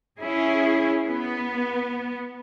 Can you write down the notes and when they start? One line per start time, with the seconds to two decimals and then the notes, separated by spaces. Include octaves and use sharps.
0.20 C#4 E4 G#4
1.06 B3